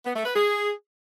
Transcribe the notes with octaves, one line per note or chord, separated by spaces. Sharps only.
B3
A3
B4
G#4